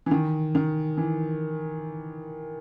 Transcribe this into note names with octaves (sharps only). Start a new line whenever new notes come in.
E3
D#3
D#3
E3